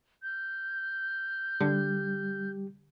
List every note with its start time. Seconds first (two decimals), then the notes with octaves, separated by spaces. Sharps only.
0.23 F6 G6
1.60 D3 G3 G4